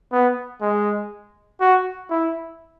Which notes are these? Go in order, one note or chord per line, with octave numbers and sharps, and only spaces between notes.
B3
G#3
F#4
E4